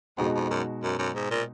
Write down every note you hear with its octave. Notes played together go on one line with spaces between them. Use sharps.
F2 B2 G#3 D#4 F#4
F2
F#2
F#2
F#2
G#2
A#2